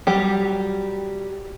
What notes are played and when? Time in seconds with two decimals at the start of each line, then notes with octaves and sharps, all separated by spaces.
0.07 F#3 G3 G4